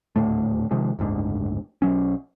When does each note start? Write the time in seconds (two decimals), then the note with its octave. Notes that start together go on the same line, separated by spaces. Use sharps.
0.16 D#1 D2 A2 A3
0.71 C3 D#3 F3 G#3
0.99 F#1 D2 G#2 D3
1.82 B1 F#3 C#4